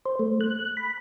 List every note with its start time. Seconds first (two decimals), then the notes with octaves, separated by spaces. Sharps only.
0.05 C5
0.19 A3
0.41 F#6
0.77 B5